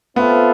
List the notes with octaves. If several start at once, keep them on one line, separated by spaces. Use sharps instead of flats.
B3 C4 F4 A4 E5